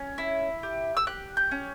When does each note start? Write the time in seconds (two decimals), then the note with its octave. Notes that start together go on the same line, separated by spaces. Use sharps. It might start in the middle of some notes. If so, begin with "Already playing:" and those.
Already playing: C#4
0.18 E4
0.63 G4
0.97 E6
1.07 G4 F#6
1.37 G6
1.51 C#4